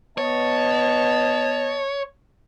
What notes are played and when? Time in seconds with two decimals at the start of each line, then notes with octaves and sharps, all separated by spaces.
0.18 B3 C#5 D#5 A5